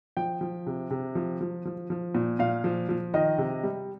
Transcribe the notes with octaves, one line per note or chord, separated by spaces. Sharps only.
F3 G5
F3
C3
C3
F3
F3
F3
F3
A#2
A#2 F5
F3
F3
D#3 D#5
C3
G3